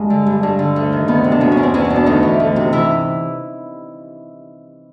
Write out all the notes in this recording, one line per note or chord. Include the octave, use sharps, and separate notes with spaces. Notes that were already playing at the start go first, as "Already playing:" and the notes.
Already playing: G2 G#3
D3
G2
G2
D3
D2
D#3
D2 B3
C3
D4
B2 C#4
C#4
E2
C4
E2 C#4
C#4
B2
D4
D2 D#4
E3
D2
C3
E3 E4